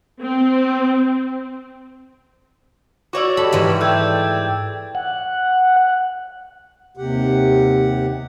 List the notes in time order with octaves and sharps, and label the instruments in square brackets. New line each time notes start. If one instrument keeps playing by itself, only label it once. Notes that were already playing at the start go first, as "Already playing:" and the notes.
[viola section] C4
[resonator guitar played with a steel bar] F#4 C#5 D5 [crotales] D6 E6
[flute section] G4 D#5 C#6 [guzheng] A4 B5
[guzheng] G#2 E3 G3
[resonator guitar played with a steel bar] A3 [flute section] D5 G5 [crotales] E6 G6 G#6
[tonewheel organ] F#5
[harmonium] D#2 C3 G4 F#5